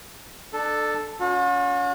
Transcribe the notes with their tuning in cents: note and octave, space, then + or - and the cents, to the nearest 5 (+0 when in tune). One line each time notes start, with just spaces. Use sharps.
D4 +25 A4 +0
C#4 +30 F#4 -45